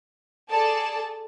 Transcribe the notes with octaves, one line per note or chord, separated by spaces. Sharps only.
G#4 A4 D5 A5